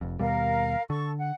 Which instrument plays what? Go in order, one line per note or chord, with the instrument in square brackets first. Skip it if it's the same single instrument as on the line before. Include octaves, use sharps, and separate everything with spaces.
[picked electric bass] F1 F2
[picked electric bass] D#2 B2 G3 [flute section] A#4 F5
[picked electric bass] D3 [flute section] A4 C#6
[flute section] F#5